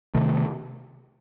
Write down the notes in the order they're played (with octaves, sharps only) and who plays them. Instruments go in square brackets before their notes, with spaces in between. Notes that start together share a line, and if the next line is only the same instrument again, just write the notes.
[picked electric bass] C3 D#3 A3